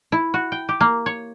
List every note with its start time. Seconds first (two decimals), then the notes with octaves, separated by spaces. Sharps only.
0.12 E4
0.34 F#4
0.52 G5
0.69 G4
0.81 A#3
1.06 C#5